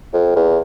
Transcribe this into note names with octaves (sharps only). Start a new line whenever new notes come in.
F2
E2